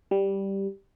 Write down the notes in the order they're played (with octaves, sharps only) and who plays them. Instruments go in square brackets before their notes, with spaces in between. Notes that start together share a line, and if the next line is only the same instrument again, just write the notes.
[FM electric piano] G3